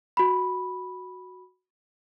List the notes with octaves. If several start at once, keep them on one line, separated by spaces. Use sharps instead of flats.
F#4 B5